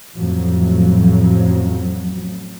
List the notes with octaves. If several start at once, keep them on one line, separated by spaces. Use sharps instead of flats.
A1 F2 A2 F3 F#3